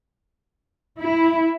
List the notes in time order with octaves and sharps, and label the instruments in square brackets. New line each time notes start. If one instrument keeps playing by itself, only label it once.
[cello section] E4